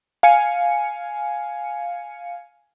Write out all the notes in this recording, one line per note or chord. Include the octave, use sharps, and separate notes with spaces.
F5 G#5 C#7